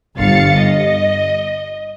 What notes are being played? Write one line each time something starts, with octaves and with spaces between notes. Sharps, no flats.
G1 F5 A6 C#7
D#5